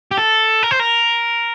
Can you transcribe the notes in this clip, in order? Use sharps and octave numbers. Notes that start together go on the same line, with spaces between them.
G4
A4
A#4
C5
A#4